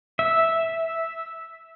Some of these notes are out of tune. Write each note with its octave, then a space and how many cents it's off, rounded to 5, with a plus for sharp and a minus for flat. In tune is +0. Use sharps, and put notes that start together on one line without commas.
E5 -5